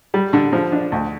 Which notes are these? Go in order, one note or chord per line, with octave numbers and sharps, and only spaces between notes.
G3
D3
F3
D4
D2